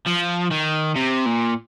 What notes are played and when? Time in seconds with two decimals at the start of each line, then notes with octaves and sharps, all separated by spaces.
0.06 F3
0.51 D#3
0.96 C3
1.26 A#2